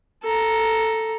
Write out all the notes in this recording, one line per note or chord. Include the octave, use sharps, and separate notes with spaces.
A4 A#5